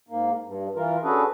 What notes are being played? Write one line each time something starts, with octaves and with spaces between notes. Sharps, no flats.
G#2 A#3
G2
E3 F4 A#4
C#4 D4 F#4 G#4 A4 B4